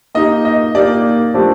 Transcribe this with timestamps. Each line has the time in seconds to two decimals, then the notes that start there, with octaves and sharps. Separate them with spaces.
0.14 A#3 D#4 G4 D#5
0.45 D#5
0.75 A#3 D#4 G4 D5
1.34 F3 A3 D4 G4 C5